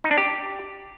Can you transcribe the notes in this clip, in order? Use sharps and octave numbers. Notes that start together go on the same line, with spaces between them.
D#4
D4
G4